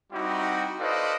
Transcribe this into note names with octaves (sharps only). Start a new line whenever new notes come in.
G3 C4 D#4 E4 F#4 G4
A4 B4 C5 D5 D#5 F5